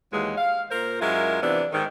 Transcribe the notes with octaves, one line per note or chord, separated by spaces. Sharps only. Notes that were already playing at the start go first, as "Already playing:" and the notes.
D#2 E3 F#3 G#3
F5
A#2 A#4 C5
F#2 G#3 E4 F4 A#4
C3 E3 F3 B3 D4
G#2 D#3